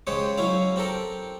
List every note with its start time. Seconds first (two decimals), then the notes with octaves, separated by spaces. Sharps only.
0.07 C#3 G#3 G4 C5 C#5
0.38 F#3 C#4 E4 F5
0.76 C4 G4 A4 A#4